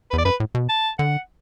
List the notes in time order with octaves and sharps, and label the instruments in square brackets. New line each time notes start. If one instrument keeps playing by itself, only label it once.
[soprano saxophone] B4
[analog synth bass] E2 [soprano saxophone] D5
[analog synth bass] F#2 [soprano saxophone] B4
[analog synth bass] A2
B2
[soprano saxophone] A5
[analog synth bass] D3 [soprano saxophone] F#5